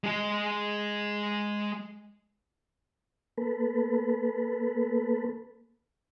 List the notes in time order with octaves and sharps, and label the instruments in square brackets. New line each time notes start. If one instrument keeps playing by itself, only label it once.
[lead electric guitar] G#3 G#4
[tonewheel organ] A#3 A4 B4